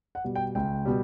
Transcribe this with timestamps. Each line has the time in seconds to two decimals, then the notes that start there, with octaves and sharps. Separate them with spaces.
0.15 F#5
0.24 B2 G3
0.36 G5
0.55 C#2 G5
0.85 B2 G3